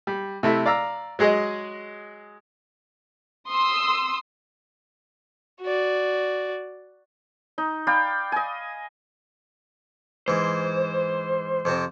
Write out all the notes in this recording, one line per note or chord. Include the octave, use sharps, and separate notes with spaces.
G3
C3 A3 E4
D5 F5 A#5 E6
F#3 G#3 G#4 D#5
C6 D#6 E6
F#4 D5
D#4
D5 F5 G5 B5
D#5 G#5
G#2 E3 C5
F2 C3 C4